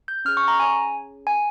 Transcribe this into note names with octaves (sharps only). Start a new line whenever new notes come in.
G6
C#4 G#4 F6
C#6
A#5
G#5
G#5